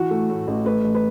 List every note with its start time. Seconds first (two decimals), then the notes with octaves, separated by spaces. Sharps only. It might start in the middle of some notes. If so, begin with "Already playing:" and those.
Already playing: E3 F#4
0.11 A3
0.30 A2
0.48 A1
0.66 A3 B4
0.84 A1
0.95 B4